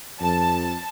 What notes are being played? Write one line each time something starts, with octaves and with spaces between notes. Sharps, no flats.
F2 A5